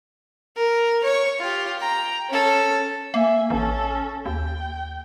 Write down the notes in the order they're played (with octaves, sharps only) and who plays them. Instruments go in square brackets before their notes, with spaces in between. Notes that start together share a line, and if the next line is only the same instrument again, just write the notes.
[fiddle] A#4
C#5 C#6
F4 G4
G5 A#5
C#4 A4
[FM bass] A#3 [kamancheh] E5 G#5
[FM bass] A1 [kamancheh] C#4 A4
[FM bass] D#2 [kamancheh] G5